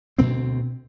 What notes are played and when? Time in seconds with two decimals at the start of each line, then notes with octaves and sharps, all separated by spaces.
0.18 D2 B2 B3 C4